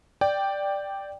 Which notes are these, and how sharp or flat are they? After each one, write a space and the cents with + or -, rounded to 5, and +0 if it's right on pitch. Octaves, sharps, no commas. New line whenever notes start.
D5 +0 G5 +0